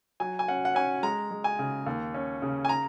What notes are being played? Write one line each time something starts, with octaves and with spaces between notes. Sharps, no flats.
F#3 G#5
G#5
C#4 F#5
F#5
C#4 G#5
G#3 A#5
G#3
G#5
C#3
D#2
C#4
C#3
G#5
A#5